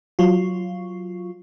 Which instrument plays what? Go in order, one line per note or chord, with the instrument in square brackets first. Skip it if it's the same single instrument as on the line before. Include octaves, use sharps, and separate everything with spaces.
[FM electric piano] F#3 F4